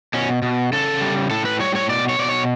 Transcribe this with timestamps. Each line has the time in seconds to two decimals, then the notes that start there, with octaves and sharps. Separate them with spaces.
0.14 B2 C#4
0.42 B2
0.72 C#3 A4
1.01 G3
1.31 A2 A4
1.45 B4
1.60 G3 C#5
1.75 C#5
1.89 B2 D5
2.09 C#5
2.19 B2 D5
2.29 C#5